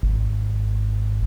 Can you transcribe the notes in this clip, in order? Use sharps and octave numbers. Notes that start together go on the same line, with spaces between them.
G#1